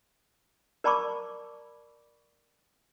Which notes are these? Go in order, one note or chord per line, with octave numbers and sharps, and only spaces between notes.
A#4 D5 A5 B5 C#6 D6